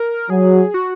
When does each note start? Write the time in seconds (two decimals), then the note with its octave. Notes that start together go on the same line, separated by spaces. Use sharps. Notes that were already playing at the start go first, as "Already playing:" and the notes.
Already playing: A#4
0.30 F#3 G#4
0.74 F#4